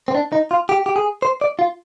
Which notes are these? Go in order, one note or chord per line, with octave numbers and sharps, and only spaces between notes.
C4
D4
D#4
F4
G4
G4
G#4
C5
D5
F4